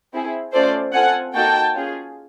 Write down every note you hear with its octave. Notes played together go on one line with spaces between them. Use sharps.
C4 E4 G#4
A3 C#4 F4 A4 C5 D5
C4 F4 A4 F#5 G#5
A#3 D#4 F#4 A4 G5 A5
C#4 F4 G#4